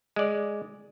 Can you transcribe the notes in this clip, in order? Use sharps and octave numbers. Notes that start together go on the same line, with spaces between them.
G#3 D5